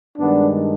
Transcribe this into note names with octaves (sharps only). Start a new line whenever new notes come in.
G2 D#3 G#3 B3 D4